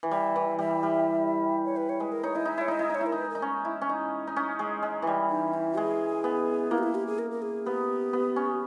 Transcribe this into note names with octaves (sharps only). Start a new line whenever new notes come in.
E3
G3 E5
E3
G3 E5
G3
C#5
B4
C#5
G#3 B4
A#4
D#4 C#5
E4 D#5
D#4 E5
E4 C#5
D#4 D#5
E4
D#4
C#5
E4
A#4
D#4
B4
A#4
D#4
C#4
E4
C#4
D#4
D#4
C#4
G#3
G#3
E3 G3
D#4
E4
G#3 G#4
B3
A#3 E4
G4
E4
G4
G#4
A#4
A#4
G#4
B3 G4
B3
C#4